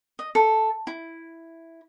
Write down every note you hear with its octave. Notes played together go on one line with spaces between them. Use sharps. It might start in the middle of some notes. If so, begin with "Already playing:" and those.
D#5
A4
E4